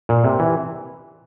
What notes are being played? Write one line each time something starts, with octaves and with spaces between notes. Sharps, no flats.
A#2
C3
E3